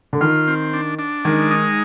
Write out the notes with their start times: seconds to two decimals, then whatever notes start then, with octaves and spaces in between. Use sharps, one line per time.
0.13 D3
0.21 D#3 F4
0.48 C4
0.73 D4
0.99 D4
1.25 D#3 G#3
1.51 D#4